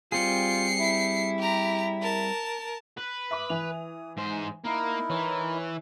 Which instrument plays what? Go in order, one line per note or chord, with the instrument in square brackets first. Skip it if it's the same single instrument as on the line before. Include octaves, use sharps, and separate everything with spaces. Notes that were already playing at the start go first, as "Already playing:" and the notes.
[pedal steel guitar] G3 C4 G#4 [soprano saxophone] F4 [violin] C7 C#7
[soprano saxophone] E4
[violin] G4 A#5
A#4 A5
[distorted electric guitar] B4
[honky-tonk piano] E5 B5 D6 [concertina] D#6
[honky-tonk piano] E3 F7
[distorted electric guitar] G#2 C5
[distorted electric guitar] A#3 [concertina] D#4 E4 A#4
[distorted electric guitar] E3 [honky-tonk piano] C#5